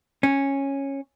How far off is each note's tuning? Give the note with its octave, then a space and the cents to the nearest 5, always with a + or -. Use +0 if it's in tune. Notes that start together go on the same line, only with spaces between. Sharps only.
C#4 -10